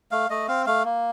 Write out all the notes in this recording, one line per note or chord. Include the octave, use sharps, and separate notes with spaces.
A3 F5
A3 D#5
C4 F5
A3 F5
A#3